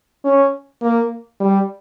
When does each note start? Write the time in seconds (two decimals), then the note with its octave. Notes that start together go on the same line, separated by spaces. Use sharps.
0.25 C#4
0.82 A#3
1.40 G3